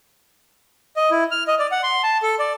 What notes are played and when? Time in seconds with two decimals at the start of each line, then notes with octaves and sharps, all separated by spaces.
0.96 D#5
1.11 E4
1.31 F6
1.47 D#5
1.59 D5
1.72 F#5
1.83 C6
2.03 A5
2.23 A4
2.39 D5